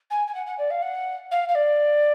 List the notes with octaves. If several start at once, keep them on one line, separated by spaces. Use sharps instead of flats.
G#5
G#5
F#5
F#5
D5
F5
F#5
F5
F5
D5